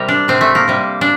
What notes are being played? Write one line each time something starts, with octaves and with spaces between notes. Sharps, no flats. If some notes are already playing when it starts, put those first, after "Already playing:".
Already playing: C3 G3 A#4
D4
C3 G3 C4
A3
A#3
C3 G3
D4